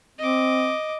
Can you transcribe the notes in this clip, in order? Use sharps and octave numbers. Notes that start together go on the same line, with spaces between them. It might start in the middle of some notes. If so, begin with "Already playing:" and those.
C4 D#5 D6